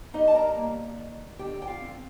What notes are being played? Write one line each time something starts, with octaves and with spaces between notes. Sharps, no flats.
G3 D#4 D#5
A5
A#4 A#5
A#3
D#3
D3 G4 G5
G5
F4 F5
C4